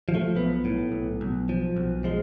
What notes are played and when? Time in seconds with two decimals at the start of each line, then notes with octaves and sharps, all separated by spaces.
0.09 F3
0.15 A3
0.36 B1 B3
0.65 A2
0.92 B1
1.21 B1
1.49 F3
1.76 B1
2.04 F3 G#3